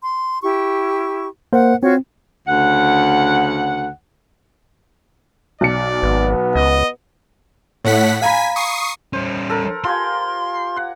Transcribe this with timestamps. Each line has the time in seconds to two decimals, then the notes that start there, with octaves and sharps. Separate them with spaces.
0.02 C6
0.43 E4 G4 C#6
1.53 A#3 A#4 C5 F#5
1.83 C4 F4 F#4 C#5
2.48 D2 C#3 F#5
5.61 B1 D5 C#7
6.03 G#1 B3
6.55 C#2 D#5
7.85 A2 A3 C#5 F#5 B6
8.22 F5 G#5 A#5 B5 B6
8.56 C#6 D#6 C7
9.13 G3 C#4 C5
9.49 A4 A#4
9.84 F4 G4 G#5 C6
10.76 F#5